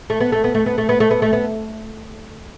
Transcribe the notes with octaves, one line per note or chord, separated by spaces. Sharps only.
A3
B3
A3
B3
A3
B3
A3
B3
A3
B3
A3
B3